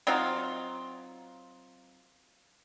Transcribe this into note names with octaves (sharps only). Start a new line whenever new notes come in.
F#3 C4 D#4 F4